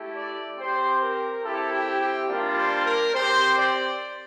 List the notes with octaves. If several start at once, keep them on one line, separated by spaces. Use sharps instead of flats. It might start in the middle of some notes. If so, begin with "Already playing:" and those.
Already playing: A3 E4 G4
D5
C4 G4 C5
A#4
C4 E4 G4 A4
G4
G4
G3 A#3 D4 F4 A#4
C5
A#4
C4 G4 C5
D5